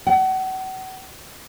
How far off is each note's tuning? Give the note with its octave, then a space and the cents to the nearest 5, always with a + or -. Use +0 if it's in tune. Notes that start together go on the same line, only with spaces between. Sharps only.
F#5 +35